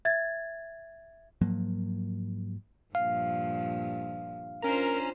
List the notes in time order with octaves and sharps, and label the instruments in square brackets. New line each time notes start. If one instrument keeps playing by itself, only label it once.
[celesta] E5 G#6 A6
[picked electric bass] G#2 F3 F#3 A#3
[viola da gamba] G2 A#2 F3 [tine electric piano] F5
[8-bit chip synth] C#4 A#5 [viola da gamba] D4 F4 C5 [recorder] A#4